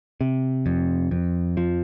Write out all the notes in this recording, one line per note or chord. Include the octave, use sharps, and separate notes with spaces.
C3
F2
F2
F3